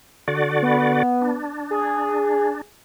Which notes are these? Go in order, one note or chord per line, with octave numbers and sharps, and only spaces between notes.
D3 F#4 D5
B3
D4
G#4